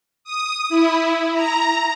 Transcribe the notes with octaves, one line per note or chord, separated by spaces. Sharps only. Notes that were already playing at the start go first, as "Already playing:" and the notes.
D#6
E4
A#5